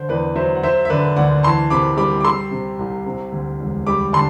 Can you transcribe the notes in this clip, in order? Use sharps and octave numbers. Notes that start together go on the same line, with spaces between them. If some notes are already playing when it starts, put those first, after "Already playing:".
Already playing: D3 C5
E2 B4 D5
F#3 C5 E5
F#5
F#3 C5 E5
E5
D3 B4 D5
D2 D5 F#5
E3 A5 C6
C3 B5 D6
G3 B5 D6
D6
G3 C6 E6
C3
C2
C3
D2
E1
G3 B5 D6
D3 A5 C6